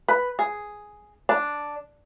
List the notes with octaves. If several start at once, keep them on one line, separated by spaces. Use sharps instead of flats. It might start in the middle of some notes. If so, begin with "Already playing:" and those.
B4
G#4
D4